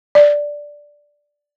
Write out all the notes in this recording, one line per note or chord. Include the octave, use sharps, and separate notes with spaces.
D5